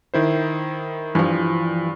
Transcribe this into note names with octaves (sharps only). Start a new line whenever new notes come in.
D#3 E4 C5
G2 E3 F3